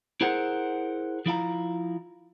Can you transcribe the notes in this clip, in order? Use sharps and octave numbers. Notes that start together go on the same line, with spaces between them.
E4 G#4 A#4 C5 F#5
F3 E4 F5 A#5